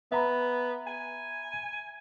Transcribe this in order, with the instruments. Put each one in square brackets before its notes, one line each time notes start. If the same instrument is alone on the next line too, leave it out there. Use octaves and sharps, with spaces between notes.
[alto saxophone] B3 [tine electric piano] E5 A#5 B5
[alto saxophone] G#5